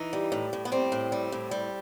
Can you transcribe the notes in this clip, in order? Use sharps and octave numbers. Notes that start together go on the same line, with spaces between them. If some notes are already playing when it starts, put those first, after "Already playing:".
Already playing: E3 D#4
G3
A2
A2
B3
G3 C4
A2
G3
A2
G3